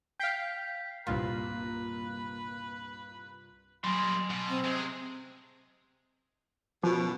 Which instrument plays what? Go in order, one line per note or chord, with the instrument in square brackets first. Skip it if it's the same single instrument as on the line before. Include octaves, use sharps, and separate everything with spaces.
[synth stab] F5 G5 [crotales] G6 B6 C7
[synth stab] C2 G2 F4 [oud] A#2 [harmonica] B4
[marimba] F#3 [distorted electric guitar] G3 A#3 [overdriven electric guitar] G#5 C6
[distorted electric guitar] B2
[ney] C4
[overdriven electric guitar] C3 [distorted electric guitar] G#3 G#4
[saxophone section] F#2 B2 [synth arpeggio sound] F3